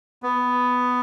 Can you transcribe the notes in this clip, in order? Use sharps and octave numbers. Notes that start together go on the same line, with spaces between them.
B3